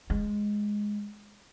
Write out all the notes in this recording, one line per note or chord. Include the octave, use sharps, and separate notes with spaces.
G#3